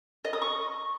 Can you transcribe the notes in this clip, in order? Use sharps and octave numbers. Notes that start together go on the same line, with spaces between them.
D#5
D#6
C#6